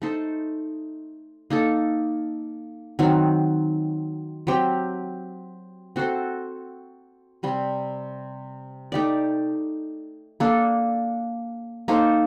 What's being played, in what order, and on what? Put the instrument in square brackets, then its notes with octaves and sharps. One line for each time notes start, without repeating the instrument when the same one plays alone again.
[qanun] A3 D#4 A4 C5
A#3 D#4 A4
D#3 F#3 C4
F#3 C4 G4
C4 F#4 A4 C5
C3 G3 C4
A3 D#4 G4 D5
A#3 D4 A4
A#3 D#4 A4 C5